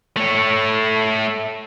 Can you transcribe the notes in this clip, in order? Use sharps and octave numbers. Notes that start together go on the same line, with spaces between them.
A3 C#5